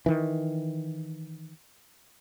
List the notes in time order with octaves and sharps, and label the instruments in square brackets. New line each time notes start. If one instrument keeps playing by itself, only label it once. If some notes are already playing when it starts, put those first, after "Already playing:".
[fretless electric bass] D#3 E3